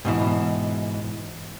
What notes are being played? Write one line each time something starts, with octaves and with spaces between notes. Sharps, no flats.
G#2 B2 E3